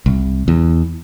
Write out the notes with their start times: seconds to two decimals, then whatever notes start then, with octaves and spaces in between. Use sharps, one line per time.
0.06 C2
0.48 E2